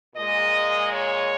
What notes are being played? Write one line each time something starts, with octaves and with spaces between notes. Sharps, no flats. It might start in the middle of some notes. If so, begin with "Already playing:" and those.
A#2 G#3 D#5
C#5